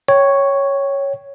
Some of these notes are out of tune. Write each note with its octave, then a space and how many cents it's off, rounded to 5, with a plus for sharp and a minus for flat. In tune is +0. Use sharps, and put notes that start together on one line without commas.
C#5 +0 G5 -10 C#6 +0